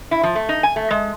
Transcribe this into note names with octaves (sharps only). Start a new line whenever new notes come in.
E4
F3
A3
D#4
G#5
A3
G#3